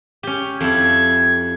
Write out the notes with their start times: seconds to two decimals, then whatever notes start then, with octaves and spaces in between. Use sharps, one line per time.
0.23 C#4 G4
0.60 F2 E4 G#6